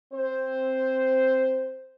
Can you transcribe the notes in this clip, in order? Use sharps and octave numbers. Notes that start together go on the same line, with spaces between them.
C4 C5